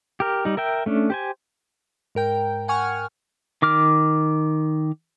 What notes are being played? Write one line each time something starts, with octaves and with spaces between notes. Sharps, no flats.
G4 A#4
G3 D#4
A#4 E5 G5
A3 C#4 D4
G4 C5 G#5
G#2 A#4 G5
F#5 G#5 C#6 F6
D#3 D6 F6